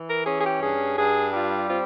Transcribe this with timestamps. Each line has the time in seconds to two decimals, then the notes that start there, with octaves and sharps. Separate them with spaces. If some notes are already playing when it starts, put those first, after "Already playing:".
Already playing: E3
0.08 A#4
0.26 C#4 G#4
0.38 G#4
0.45 G4
0.62 G2 G#4
0.98 G2 G#4
1.33 G3 F4
1.69 C4 F4